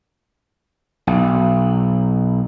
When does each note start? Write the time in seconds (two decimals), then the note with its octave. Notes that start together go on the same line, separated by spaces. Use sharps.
1.07 B1